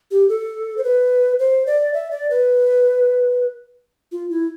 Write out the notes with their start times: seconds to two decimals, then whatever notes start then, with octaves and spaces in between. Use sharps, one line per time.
0.11 G4
0.29 A4
0.77 C5
0.84 B4
1.39 C5
1.67 D5
1.94 E5
2.11 D5
2.30 B4
4.12 F4
4.30 E4